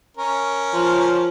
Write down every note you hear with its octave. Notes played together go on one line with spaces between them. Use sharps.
C#4 A#4
F3